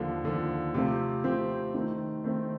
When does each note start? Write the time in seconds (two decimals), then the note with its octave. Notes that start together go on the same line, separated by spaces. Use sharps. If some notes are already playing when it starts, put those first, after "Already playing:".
Already playing: D#2 D3 F3
0.24 D#2 D3 F3
0.74 C3 F3 A3 C4 G4
1.24 C3 F3 A3 C4 G4
1.74 D#3 A3 C4 D#4
2.24 D#3 A3 C4 D#4